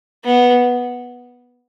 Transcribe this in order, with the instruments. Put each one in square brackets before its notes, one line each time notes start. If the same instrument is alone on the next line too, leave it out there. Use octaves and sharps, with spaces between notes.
[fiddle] B3